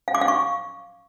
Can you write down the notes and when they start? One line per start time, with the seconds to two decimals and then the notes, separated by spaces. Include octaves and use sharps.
0.08 F5
0.15 D6
0.21 F5
0.28 C#6